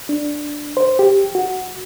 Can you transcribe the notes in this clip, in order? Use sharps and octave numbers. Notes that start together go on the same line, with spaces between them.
D4
C5
G4
F#4